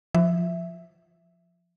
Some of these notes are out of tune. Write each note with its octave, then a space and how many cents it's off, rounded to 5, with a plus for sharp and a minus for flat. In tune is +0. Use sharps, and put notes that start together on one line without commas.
F3 +0 E5 +0